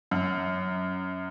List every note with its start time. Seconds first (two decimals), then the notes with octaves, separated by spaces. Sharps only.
0.11 F#2